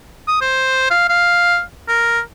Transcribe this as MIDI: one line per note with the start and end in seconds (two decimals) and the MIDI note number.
0.28 0.40 87
0.41 0.88 72
0.90 1.08 77
1.09 1.60 77
1.88 2.20 70